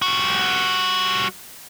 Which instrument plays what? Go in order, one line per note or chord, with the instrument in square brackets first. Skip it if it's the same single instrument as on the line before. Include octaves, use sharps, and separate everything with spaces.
[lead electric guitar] G3 F#4